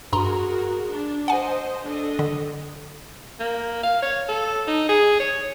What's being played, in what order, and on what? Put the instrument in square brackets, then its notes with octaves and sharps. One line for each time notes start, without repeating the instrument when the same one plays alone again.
[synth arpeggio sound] G2 A#5 C6 [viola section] F#4 G#4 A#4
[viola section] D4
[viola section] C5 D#5 [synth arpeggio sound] F#5 G#5
[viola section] D4 A4 D#5
[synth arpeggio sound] D3
[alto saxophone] A#3
F5
C#5
A4
D#4
G#4
C#5